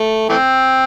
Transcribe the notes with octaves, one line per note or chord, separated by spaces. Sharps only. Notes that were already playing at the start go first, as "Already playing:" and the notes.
Already playing: A3
E3 A3 C4